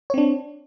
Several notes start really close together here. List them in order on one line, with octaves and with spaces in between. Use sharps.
C#5 C4 D4